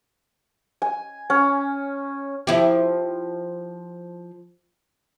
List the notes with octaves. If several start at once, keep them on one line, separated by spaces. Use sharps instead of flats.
G#5
C#4
F3 E4 G4